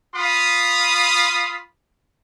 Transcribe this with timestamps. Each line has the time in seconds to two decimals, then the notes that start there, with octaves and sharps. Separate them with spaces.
0.15 F4 F5 B5 D#6